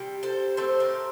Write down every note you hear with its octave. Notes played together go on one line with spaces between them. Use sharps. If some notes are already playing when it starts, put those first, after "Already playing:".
Already playing: C3 G3 G5
A4 C5
A2 A3 C4 A4 C5
G4 A#4